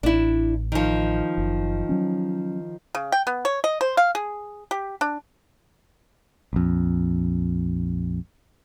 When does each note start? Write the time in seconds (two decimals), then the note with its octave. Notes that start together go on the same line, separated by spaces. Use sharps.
0.03 A1 D4 E4
0.72 D#3 F3
1.38 F#1
1.89 F#3 C#4
2.95 C#3
3.12 G5
3.27 B3
3.45 C#5
3.64 D#5
3.81 C5
3.97 F5
4.15 G#4
4.71 G4
5.01 D4
6.53 A#1 F2